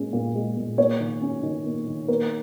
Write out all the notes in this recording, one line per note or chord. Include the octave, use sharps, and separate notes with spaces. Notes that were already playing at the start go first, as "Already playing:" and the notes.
Already playing: A#2 G#3 C#4
A#2
G#3
A#2
A#3 C#5
D#3
C#4
D#3
A#3
D#3
A#3 A#4